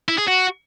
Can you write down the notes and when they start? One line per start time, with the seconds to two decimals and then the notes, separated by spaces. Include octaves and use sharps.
0.08 E4
0.18 G#4
0.28 F#4